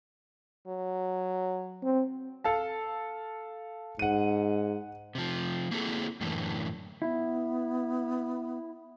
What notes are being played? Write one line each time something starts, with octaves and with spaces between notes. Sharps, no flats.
F#3
C4
A4 F5 A5
G#2 F#5 D#7
C3 F3
A#3 C4 E4 F#4 G#4 A4
F#2 A2 D3 E3
B3 E4